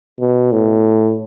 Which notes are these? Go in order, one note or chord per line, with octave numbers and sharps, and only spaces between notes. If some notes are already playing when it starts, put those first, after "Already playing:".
B2
A2